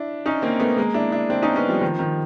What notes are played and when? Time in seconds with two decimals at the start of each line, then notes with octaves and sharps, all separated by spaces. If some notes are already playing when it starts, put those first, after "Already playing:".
Already playing: D4 E4
0.26 C#4 D#4
0.42 A#3 C4
0.60 A3 B3
0.78 G#3 A#3
0.94 D4 E4
1.12 D4 E4
1.30 C4 D4
1.42 C#4 D#4
1.56 B3 C#4
1.68 F3 G3
1.82 D#3 F3
1.99 D#3 F3